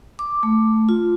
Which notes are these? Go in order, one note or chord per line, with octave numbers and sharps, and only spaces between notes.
D6
A3
F4